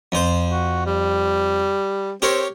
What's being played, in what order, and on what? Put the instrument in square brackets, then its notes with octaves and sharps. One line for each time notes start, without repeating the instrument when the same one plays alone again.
[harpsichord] F2 C5
[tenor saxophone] F#4
G3
[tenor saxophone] C4 [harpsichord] G4 A#4 C#5